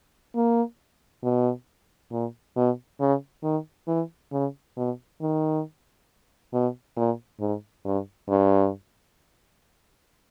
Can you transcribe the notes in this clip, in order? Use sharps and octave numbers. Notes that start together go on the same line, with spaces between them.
A#3
B2
A#2
B2
C#3
D#3
E3
C#3
B2
D#3
B2
A#2
G#2
G2
G2